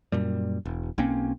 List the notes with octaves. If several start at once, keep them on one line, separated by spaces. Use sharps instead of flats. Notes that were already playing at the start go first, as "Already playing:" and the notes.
F#2 A#2 G3
E1
B1 A#3 C4 C#4